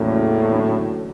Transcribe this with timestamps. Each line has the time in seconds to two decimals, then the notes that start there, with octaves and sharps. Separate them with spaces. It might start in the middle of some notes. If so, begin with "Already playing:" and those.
Already playing: E2 A2 C#3 F#3 A#3
0.51 D3 F#3